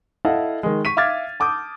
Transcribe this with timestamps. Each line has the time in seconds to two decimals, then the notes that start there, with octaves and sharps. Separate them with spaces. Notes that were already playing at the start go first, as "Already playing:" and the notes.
0.25 E4 A4 D#5 F5 F#5 A5
0.63 D#3 G#3
0.85 C#6 B6 D#7
0.97 E5 F5 D6 F6 G#6 A6
1.40 A5 D6 D#6 G6